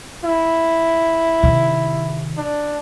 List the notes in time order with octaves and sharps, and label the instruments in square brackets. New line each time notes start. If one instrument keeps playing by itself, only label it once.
[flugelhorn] E4
[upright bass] C3 D#3
[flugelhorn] D4